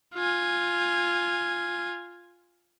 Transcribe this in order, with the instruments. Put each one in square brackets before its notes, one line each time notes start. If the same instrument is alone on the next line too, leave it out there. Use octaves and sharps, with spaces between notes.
[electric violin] F4 G#5